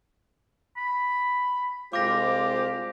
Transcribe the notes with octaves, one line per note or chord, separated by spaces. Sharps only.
B5
C2 G#3 F4 G4 C5 D6 A#6